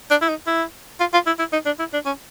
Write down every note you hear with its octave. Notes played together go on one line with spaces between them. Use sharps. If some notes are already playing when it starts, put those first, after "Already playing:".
D4
E4
D#4
E4
F4
F4
E4
E4
D#4
D4
E4
D4
C#4